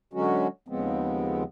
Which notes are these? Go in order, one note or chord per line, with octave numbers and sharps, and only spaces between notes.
D3 F#3 G#3 C#4 F#4
D#2 C#3 F3 G#3 B3 C4